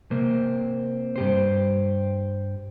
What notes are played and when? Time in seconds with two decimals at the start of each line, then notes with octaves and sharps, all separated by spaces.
0.11 C3 A#3 C4
1.16 G2 G4 C5